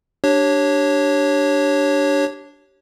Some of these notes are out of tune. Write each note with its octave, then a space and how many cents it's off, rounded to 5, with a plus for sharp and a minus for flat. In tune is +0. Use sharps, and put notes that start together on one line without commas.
D4 +0 G4 -15 C#5 -10